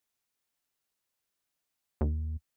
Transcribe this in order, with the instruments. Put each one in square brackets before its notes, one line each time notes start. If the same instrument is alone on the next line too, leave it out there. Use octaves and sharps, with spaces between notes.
[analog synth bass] D#2